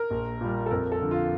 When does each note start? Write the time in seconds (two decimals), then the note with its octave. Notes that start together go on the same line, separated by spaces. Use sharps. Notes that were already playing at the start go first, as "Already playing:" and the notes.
Already playing: A#4
0.10 A#1
0.41 A#2 G3
0.66 A4
0.71 F2 A#4
0.92 A4
1.01 D3 F3
1.11 F4